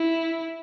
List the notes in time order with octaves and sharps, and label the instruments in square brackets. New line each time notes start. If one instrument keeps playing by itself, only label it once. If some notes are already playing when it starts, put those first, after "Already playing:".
Already playing: [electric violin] E4